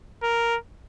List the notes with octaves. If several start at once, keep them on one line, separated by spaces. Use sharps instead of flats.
A#4